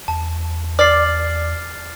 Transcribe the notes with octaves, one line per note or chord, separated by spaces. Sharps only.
E2 A5
D5 F6 A6 C7